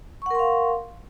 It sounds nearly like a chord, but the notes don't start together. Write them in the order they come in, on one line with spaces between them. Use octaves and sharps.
C#6 F#5 A#4 C6 F5